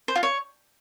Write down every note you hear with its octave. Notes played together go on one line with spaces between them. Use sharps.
C5
F4
C#5